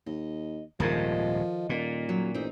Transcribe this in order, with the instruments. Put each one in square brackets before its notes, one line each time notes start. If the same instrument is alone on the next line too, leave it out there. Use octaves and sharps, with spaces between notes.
[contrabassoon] D#2 [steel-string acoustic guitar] D#5
[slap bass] D#1 G#2 C3 [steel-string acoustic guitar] D#3 A4 D#5 [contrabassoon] F3
[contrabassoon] D#1 [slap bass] A#2
[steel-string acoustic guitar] F#3
[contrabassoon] A1 [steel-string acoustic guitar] C4 D#4